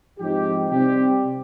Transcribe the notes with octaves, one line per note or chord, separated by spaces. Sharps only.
G#2 F3 G#3 C4 D#4 G4
C3 G3 C4 G4